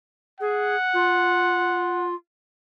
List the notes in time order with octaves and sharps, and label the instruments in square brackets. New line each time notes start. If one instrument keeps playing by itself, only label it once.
[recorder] G#4 [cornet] F#5
[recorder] F4